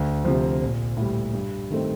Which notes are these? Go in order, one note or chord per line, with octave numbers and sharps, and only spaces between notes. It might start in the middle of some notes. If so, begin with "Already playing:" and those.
Already playing: D2
C3 F3
A#1
A2 G3
G2
D#3 A3 C4